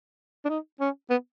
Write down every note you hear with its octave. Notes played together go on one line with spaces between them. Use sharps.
D4
D#4
C#4
B3